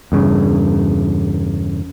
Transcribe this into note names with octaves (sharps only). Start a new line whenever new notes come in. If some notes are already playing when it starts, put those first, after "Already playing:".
E2 G2 C#3